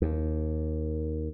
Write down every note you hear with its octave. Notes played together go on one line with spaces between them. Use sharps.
D#2